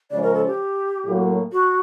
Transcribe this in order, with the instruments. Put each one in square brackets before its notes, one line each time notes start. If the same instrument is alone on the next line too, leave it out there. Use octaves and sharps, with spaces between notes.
[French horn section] C#3 F3 G#3 C#4 [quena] D5
[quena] A#4
A4
G4
[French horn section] A2 F#3 A#3
[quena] F#4